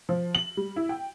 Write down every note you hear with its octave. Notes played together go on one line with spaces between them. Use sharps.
F3
F#7
G3
E4
G5